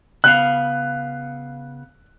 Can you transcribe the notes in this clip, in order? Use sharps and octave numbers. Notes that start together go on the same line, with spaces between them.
C#3 B3 F5 F#6